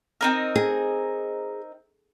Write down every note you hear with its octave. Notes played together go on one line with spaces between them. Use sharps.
C4 D#4 A#4
G#4